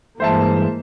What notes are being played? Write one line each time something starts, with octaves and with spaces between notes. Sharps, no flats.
G2 E3 G#3 A#3 C5 E5 A5